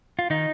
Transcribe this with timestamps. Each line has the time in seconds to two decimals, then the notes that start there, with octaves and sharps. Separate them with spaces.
0.19 F4
0.30 D#3 D#4